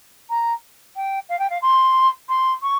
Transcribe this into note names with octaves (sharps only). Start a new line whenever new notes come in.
A#5
G5
F5
G5
F5
C6
C6
C#6